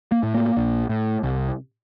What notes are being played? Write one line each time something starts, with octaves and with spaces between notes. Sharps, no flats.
A#3
A2
A#3
A#1
A2
C2